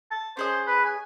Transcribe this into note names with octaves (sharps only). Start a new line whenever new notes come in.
A5
C#4 G#4 C5 D#5
B4
G#5